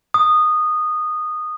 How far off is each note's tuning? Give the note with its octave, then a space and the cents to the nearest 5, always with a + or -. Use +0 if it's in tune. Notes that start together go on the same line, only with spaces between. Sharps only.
D#6 -15